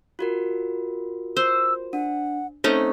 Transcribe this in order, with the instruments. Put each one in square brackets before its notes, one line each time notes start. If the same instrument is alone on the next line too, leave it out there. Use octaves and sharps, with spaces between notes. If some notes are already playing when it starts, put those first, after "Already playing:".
[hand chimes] F4 F#4 A#4
[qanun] C5 [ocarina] E6
[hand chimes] D4 [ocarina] F#5
[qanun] A3 C#4 D#4 [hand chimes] C4 [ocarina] C5